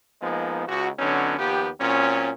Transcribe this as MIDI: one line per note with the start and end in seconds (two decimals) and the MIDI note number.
0.22 0.67 53
0.22 0.67 56
0.22 0.67 58
0.22 0.67 59
0.22 0.67 63
0.68 0.88 37
0.68 0.88 66
0.99 1.38 50
0.99 1.38 54
0.99 1.38 59
0.99 1.38 61
0.99 1.38 63
1.39 1.69 39
1.39 1.69 53
1.39 1.69 59
1.39 1.69 67
1.80 2.31 46
1.80 2.31 54
1.80 2.31 60
1.80 2.31 61